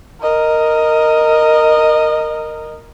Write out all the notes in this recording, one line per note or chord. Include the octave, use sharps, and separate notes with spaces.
A#4 D#5